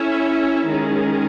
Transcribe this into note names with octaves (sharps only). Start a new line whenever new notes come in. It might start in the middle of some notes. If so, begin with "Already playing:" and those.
Already playing: C#4 E4 A4 C#5 E5
D#3 G#3 C#4 G#4